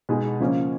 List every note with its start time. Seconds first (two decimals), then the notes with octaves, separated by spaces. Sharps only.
0.09 B2 G#3 D#4 G#4
0.40 C#3 F3 A#3 C#4